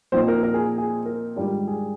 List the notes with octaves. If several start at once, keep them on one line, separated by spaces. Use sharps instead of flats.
A#2 F3 C4 D#4 C5
A#4
A#4
G#4
G#4
A#4
G#2 D#3 G3 D4 F4
G#4